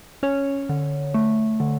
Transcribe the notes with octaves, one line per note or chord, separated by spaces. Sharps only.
C#4 C#5
D3
A3
D3